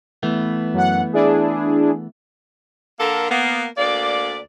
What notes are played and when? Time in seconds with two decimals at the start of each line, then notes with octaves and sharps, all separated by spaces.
0.23 E3 A3 B3
0.73 F#2 F#5
1.13 D4 E4 G#4
2.99 D3 A#3 A4 A#4
3.29 A#3 B3
3.77 D2 A#3 D5